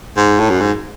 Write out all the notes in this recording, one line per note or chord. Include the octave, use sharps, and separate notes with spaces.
G#2
A2
F#2
G#2